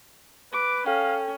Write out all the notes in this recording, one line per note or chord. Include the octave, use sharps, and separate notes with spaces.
B4 D6
C#4 A4 F5 G5